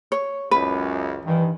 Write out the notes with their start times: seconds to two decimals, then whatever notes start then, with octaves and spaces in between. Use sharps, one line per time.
0.12 C#5
0.51 C#2 F#2 B4
1.25 G2 D#3 E3